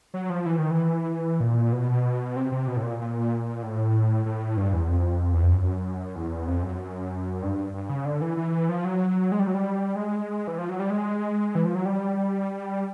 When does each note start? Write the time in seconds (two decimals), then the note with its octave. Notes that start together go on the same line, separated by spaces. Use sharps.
0.14 F#3
0.30 F3
0.46 E3
0.59 D#3
0.71 E3
1.40 A#2
1.73 B2
2.36 C3
2.52 C3
2.68 B2
2.77 A2
2.83 A#2
2.99 A#2
3.63 A2
4.26 A2
4.57 G2
4.74 E2
4.89 F2
5.33 E2
5.43 F2
5.53 F#2
6.16 E2
6.47 F2
6.63 F#2
7.42 G2
7.74 G2
7.90 C#3
8.05 D3
8.21 E3
8.37 E3
8.69 F3
8.85 F#3
9.32 G#3
9.39 G3
9.47 F#3
9.54 G3
9.96 G#3
10.48 E3
10.58 F3
10.69 F#3
10.80 G3
10.90 G#3
11.55 E3
11.65 F3
11.75 F#3
11.85 G3